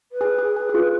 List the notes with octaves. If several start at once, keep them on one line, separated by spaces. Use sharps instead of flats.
B4
G#4
G#4
G#4
G#4
F4